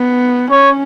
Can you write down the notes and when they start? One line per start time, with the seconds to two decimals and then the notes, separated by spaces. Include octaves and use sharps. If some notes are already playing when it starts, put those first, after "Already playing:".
Already playing: B3
0.51 C#4 C#5